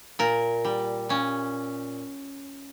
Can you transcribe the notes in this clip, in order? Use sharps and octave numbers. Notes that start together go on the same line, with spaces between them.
A#2 A#4
G3
A#2 C#4